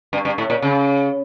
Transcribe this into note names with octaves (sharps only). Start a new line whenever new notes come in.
G2
G2
A2
A#2
C#3